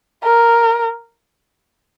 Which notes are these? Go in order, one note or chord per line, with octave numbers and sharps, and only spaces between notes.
A#4